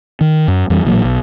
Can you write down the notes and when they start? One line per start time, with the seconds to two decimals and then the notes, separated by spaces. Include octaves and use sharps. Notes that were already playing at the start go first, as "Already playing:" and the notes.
0.21 D#3
0.48 F#2
0.70 F2 E3 G3
0.85 A1 A#2 F#3
1.04 B1